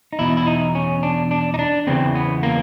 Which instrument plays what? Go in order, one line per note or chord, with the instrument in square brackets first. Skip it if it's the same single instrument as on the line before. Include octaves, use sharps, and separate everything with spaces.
[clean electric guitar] D#4
E2 B2 E4
E4
D#4
C#4
D4
D4
D#4
D4
E2 C#3 E3 C4
B3
A#3